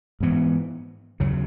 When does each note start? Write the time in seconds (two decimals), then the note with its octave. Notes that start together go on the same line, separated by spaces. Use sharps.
0.20 G#2 E3 B3
1.20 D#2 C#3 F#3